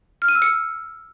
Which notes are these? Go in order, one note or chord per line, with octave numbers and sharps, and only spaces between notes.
F6
D#7
E6
C#7